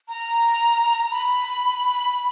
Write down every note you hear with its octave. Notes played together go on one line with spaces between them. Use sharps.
A#5
B5